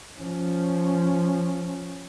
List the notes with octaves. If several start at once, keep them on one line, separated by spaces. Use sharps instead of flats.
F3 C#4